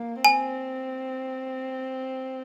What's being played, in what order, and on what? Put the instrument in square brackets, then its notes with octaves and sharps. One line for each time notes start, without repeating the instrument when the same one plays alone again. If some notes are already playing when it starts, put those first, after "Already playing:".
Already playing: [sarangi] A#3
[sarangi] C4 [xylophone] G#5